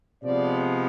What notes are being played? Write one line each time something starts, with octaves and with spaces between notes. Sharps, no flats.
C3 F3 G#3 B3 D5